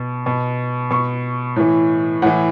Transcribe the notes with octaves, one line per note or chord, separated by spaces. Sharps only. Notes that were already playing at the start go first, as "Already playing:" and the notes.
Already playing: B2
B2
B2 C#6
A2 E3
A2 E3 F#5